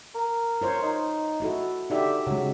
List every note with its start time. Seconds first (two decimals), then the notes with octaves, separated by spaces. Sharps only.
0.15 A#4
0.62 F4 C5 C#5
0.83 D#4
1.40 E4 F#4 A4
1.90 D3 D#4 G4 E5
2.27 C#3 F#3 G#3